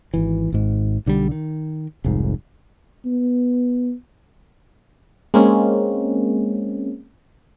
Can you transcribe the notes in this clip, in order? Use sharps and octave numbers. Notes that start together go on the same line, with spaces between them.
G#1 E3
G#1 G#2
B1 D3 F3 G3
D#3
F1 C2 G#2
B3
G#3 A#3 C4 C#4